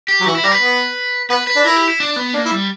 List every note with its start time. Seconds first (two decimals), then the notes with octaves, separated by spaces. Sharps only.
0.08 G4
0.21 F#3
0.26 E3 F#4
0.35 E4
0.44 G3 A#4
0.52 B4
0.61 B3
1.30 B3 B4
1.47 B4
1.56 D4
1.64 E4 A#4
1.76 G4
1.88 E4
2.00 D4
2.16 B3
2.34 A#3 D4
2.45 E4
2.51 G3